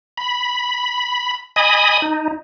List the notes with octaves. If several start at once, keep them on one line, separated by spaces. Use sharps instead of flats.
B5
D#5 G#5 B5 D#6
D#4